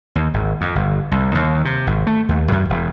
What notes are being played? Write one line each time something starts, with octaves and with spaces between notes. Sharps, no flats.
D#2
G#1
F2
G1
C2
D#2
C3
G#1
A3
D#2
F#2
E1